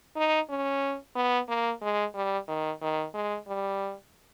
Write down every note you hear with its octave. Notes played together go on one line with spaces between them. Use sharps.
D#4
C#4
B3
A#3
G#3
G3
D#3
D#3
G#3
G3